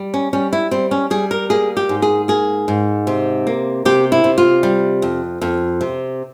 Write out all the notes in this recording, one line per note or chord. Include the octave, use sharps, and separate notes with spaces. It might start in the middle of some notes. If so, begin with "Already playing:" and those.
Already playing: G3
C#4
G3 C#4
E4
G3 C4
C#4
G3 G#4
A#4
A#3 G#4
G4
G#2
G#4
A#3 G#4
G#2
C3
A#3
C3 G4
E4
C3
F4
G3
F2
F2
C3